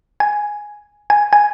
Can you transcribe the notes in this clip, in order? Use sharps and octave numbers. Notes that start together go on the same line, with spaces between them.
G#5
G#5
G#5